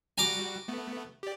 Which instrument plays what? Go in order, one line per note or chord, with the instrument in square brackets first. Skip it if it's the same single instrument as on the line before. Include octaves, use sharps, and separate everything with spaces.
[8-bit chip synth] G3 F#4 [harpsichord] G#5 A#5 D6
[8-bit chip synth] A3 B3
G4 D5